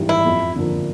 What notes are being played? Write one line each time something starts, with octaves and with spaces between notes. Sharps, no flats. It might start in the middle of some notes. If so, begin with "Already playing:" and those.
Already playing: G#1 G#2 E3 G3
E4
F2
D3 F3 A#3